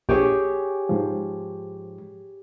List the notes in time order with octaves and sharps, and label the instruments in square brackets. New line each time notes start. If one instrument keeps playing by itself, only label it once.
[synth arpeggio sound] A#1 [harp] G4 G#4 C#5
[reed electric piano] G#2 F3